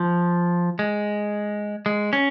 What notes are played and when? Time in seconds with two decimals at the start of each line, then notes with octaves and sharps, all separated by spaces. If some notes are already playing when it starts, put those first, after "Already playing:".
Already playing: F3
0.79 G#3
1.86 G#3
2.13 C#4